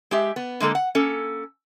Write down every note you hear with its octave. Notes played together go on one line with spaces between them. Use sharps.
G#3 G4 E5
B3
D3 G#3 A#3 A4
F#5
A#3 C#4 A4